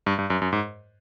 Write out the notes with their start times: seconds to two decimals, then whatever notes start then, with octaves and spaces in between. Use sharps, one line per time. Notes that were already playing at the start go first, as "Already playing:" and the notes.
0.06 G2
0.19 G2
0.30 F#2
0.42 F#2
0.53 G#2